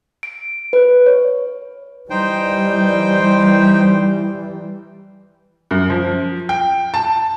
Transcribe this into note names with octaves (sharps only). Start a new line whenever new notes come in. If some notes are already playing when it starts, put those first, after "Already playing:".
D7
B4
C#5
E3 G3 D#4 C5 G5
F#2
F3
G5
A5